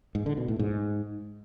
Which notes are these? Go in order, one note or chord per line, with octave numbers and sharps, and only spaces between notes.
G#2
D3
B2
A2
G#2